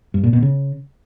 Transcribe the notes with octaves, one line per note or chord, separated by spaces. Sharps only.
G2
A#2
B2
C#3